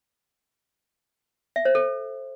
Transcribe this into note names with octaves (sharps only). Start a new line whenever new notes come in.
E5
C5
A4